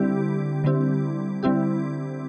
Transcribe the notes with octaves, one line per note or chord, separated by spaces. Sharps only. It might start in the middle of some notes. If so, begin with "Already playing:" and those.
Already playing: D3 G3 C4 E4 G4
D3 G3 C4 E4 G4
D3 G3 C4 E4 G4